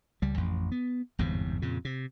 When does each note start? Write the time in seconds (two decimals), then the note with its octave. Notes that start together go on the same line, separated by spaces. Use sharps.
0.22 C#2 G3
0.37 A1 F2
0.72 B3
1.19 G1 E2 G#2 C3
1.62 F2 A#2 C#3
1.85 C3